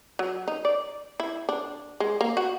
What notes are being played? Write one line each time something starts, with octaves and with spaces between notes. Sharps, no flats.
F#3
D#4
D5
E4
D4
G#3
A#3
F#4